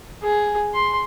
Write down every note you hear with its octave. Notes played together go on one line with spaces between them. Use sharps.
G#4
C6